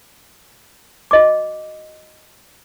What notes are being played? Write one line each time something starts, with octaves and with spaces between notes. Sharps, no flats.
F#4 D#5 D6